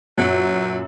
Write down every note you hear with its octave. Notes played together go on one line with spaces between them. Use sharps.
F#2 A#2 F#3